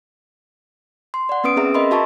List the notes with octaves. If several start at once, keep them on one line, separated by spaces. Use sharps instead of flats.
C6
D5 F#5
B3 C#4 B4 D#6 D7
C4 C#4 G#4 E5 A#5
A#4 D#5 E5 B5 C6
F#4 E5 A5 A#5 C#6